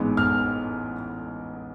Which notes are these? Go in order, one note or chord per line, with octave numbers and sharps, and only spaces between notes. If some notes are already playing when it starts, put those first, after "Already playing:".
Already playing: A1 G#2 G#3 B3
F6